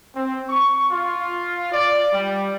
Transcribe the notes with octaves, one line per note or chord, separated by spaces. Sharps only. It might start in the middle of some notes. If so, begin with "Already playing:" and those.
C4
C#6
F4
D5
G3